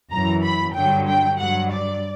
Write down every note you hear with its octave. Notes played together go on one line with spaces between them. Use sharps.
F#2 E3 A#5
B5
G2 D3 F#3 G5
G5
G2 F#3 F#5
D5